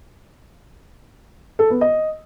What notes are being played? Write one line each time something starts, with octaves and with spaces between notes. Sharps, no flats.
A4
B3
D#5